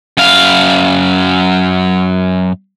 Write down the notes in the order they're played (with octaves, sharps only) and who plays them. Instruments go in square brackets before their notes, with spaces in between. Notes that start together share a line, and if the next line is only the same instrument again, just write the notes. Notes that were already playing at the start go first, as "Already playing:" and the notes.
[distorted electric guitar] F#2 F5